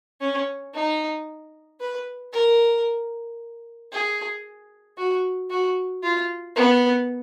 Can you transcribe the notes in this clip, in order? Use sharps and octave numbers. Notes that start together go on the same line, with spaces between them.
C#4
D#4
B4
A#4
G#4
F#4
F#4
F4
B3